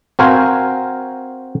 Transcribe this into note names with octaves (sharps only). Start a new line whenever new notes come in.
C4 F#4 A#4 C5 F5 G#5